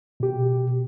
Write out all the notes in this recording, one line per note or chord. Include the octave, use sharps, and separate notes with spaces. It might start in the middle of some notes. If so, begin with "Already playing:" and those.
B2 G4